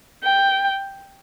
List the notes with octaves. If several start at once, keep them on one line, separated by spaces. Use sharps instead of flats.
G5